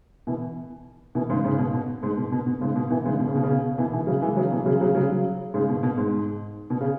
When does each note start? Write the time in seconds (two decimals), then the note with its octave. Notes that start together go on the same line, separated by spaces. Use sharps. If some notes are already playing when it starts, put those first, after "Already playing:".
0.27 B2 E3
1.15 B2 E3
1.29 G#2 C#3
1.44 G#2 C#3
1.58 B2
1.74 B2
2.03 G#2
2.17 B2
2.32 B2
2.47 B2
2.61 G#2 C#3
2.76 B2
2.90 B2 E3
3.05 G#2 C#3
3.19 B2
3.27 C#3
3.36 B2
3.43 C#3
3.51 B2
3.78 B2 E3
3.93 B2 E3
4.07 C#3 F#3
4.22 E3 G#3
4.37 C#3 F#3
4.51 B2 E3
4.66 C#3 F#3
4.81 C#3 F#3
4.95 C#3 F#3
5.10 C#3 F#3
5.54 G#2 C#3
5.69 B2
5.83 B2
5.98 G#2
6.70 B2
6.81 C#3